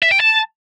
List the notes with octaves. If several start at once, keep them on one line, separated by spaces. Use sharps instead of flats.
E5
G5
A5